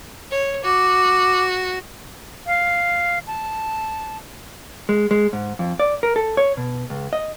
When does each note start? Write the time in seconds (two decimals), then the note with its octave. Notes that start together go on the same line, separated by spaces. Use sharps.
0.30 C#5
0.64 F#4 D6
2.47 F5
3.27 A5
4.89 G#3
5.11 G#3
5.33 G#2
5.59 F2
5.80 D5
6.03 A#4
6.16 A4
6.37 C#5
6.57 B2
6.90 C#2
7.13 D#5